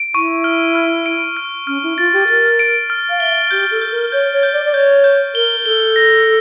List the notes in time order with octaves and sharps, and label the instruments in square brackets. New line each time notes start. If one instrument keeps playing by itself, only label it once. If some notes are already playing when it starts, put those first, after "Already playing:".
Already playing: [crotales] D7
[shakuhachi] E4 [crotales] C#6
[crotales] F6
F6
D7
F6
[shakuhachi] C#4 [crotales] F6
[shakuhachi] E4
[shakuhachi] F4 [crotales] A6
[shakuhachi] G4
[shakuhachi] A#4 [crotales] A6
[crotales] D7
F6
[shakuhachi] F5
[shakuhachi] E5 [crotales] G7
[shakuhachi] G4 [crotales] G6
[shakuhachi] A4
[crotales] G6
[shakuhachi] A#4
[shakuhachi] C#5 [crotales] G6
[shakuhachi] C#5
[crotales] G6
[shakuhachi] D5
D5
[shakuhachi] C#5 [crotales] G6
[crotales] G6
[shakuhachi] A#4 [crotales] G7
[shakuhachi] A4 [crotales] G7
[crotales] A#6